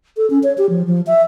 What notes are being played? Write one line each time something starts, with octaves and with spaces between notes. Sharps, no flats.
A4
C#4
C#5
G4
F3
F3
E5